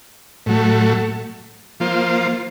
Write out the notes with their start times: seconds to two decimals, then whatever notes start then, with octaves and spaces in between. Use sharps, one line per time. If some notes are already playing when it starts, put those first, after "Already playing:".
0.46 A2 F#3 A3
1.80 F3 A#3 F4 C5